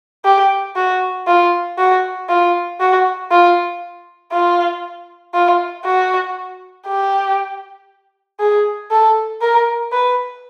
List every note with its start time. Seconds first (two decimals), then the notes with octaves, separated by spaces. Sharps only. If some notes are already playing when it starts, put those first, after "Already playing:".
0.25 G4
0.76 F#4
1.27 F4
1.79 F#4
2.29 F4
2.80 F#4
3.31 F4
4.32 F4
5.34 F4
5.85 F#4
6.86 G4
8.40 G#4
8.91 A4
9.41 A#4
9.92 B4